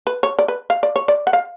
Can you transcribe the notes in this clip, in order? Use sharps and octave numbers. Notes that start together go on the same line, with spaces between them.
B4
C#5
D5
B4
F5
D5
C#5
D5
F#5
F5